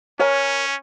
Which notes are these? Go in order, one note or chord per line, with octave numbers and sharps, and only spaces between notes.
C#4 A#4 C#5 G#5